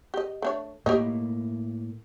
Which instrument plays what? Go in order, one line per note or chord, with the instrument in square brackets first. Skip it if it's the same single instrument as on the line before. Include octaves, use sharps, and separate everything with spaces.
[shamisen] G4 D#5
A3 D4 C#5
[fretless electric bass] A2 A#3 [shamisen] G4 C#5 D#5